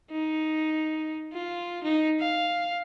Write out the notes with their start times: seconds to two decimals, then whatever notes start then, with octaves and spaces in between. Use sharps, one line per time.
0.11 D#4
1.33 F4
1.84 D#4
2.20 F5